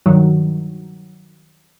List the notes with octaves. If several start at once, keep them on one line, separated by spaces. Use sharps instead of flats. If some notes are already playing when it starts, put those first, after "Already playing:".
G2 D#3 F#3